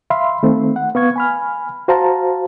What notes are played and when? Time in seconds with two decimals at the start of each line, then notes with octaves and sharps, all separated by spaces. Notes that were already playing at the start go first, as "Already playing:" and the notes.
0.10 E5 F5 B5 C6
0.43 D#3 A3 C4
0.76 F#5
0.95 B3 F5 C#6 G#6
1.16 G#5 B5 F6
1.88 F#4 C5 F5 A5 A#5